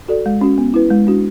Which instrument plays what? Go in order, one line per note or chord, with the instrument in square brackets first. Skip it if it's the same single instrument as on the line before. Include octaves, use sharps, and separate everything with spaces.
[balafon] F#4 A4 D5
G#3
C#4 F#4
B3
E4 B4
G#3
D4 F#4